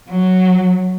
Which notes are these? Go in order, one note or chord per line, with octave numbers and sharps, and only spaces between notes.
F#3